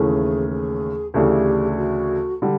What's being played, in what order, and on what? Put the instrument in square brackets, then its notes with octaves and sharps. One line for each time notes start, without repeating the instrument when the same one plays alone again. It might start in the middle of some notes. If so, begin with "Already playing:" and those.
Already playing: [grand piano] D#2 C#3 E3 A3 C#4 [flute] G#4
[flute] G#4
[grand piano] D2 C#3 E3 A3 D4 [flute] G4
[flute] G4
F#4
[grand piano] D3 G3